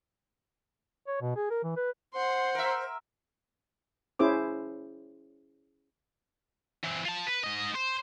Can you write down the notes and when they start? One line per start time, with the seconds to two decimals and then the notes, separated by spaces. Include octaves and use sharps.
1.07 C#5
1.21 B2
1.36 G#4
1.50 A#4
1.64 E3
1.77 B4
2.14 C5 F#5 C6
2.55 A#4 E5
4.19 C#4 E4 G#4 C5 D6
6.84 E3 C4
7.05 F4 A5
7.27 B4
7.44 G#2 D#5
7.75 C5